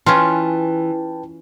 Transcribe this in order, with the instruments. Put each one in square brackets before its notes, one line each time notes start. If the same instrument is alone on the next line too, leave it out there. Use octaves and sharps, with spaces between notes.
[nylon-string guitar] E3 [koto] C#4 F4 [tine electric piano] B4 G5 A5